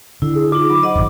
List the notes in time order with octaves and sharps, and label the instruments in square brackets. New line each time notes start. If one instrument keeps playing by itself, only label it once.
[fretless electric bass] D3 [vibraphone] E4
[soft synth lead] G#4
[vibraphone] D#4 F4 [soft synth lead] D6
[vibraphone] F#3 B5
C5 D#5 F#5
[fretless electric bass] D#1 G#1